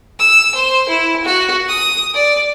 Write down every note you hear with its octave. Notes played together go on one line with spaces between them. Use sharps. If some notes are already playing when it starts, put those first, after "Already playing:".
E6
C5
E4
F#4
D#6
D5